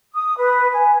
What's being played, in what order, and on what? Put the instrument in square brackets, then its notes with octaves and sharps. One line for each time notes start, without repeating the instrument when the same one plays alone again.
[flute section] D#6
B4
G#5